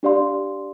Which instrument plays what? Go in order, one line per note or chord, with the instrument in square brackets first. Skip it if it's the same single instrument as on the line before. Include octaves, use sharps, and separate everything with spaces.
[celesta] D4 G4 D5 F5 C6